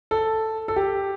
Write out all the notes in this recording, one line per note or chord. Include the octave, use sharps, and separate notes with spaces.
A4
A4
G4